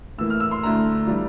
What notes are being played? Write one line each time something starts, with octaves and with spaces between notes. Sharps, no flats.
A2 E3 A#3 E6
F6
E6
C6
D2 D3 A3 E4 A#5
E3 G3 D4 F4